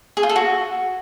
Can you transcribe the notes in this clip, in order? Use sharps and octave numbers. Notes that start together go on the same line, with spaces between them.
G#4
F4
A4
F#4